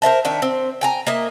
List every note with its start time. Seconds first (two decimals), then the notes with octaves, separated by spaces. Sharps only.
0.02 A#4 C5 E5 A5
0.25 D#3 D4 E5
0.42 C4
0.81 G5 G#5 A#5
1.07 A#3 D#5 E5